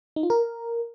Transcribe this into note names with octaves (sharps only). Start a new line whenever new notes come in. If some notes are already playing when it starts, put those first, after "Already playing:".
D#4
F4
A#4